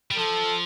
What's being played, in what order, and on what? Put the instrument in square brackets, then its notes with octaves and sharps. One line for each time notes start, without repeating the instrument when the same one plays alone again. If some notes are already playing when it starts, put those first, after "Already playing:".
[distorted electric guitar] G3
[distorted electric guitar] F3 [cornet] A4